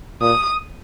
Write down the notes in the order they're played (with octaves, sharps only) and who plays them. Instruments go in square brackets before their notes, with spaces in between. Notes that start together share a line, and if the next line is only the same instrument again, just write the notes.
[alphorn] A#2 [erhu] D#6